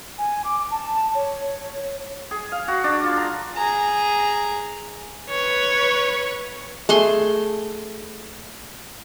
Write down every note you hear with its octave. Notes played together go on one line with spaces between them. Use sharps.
G#5
D6
A5
C#5
G#4
F5
F#4
D4
F4
A#5
G#4 A#5
B4 C#5
A3 G#4 C6